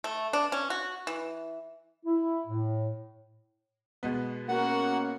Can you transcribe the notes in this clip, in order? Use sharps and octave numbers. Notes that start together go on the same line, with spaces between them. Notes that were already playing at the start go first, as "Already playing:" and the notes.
A3
D4
C#4
F#4
E3
E4
A2
B2 G#3 B3
A#3 C#4 F#4 A#4 F#5